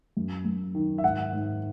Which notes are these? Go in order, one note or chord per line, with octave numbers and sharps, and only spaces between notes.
F#2
F#2
D#3
E5
G#2 F#5
G#2